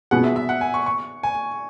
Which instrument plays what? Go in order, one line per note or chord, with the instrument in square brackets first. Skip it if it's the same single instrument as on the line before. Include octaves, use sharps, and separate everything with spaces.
[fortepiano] B2 B3 G#4 [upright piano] F#5
[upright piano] E5
E5
F#5
G#5
C#6
C#6
G#5